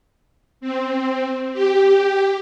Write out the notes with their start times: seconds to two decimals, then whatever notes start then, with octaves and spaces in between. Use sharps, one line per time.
0.61 C4
1.53 G4